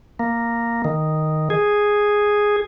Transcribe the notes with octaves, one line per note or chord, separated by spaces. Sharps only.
A#3
D#3
G#4